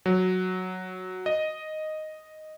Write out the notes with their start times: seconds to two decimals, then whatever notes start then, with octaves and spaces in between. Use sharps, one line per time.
0.06 F#3
1.26 D#5